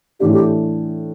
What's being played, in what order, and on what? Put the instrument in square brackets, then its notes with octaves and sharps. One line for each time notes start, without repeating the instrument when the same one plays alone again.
[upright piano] A2 E3 A3 D4 [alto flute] G4
[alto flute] G4